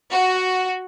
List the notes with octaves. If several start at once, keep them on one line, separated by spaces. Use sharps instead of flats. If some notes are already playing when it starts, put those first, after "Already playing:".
F#4